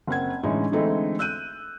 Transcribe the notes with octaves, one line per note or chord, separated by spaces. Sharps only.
F#1 C4 F#5 G#6
A2 D3 E3 G#3 C#4 D#4
D3 E3 G#3 A3 C4 D#4
E6 F#6 G6 D#7